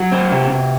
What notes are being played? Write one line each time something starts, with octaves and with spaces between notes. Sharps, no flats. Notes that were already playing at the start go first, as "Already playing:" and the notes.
Already playing: F#3 F#4
C4
C3
C3